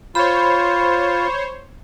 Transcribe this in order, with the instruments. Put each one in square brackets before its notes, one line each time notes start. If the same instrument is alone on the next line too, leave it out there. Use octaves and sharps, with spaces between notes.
[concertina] F4 [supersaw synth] C5 C#5 [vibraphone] B5